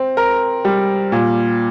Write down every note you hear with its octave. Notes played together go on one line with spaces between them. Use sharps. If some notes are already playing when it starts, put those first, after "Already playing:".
Already playing: C4
A#4
G3
A#2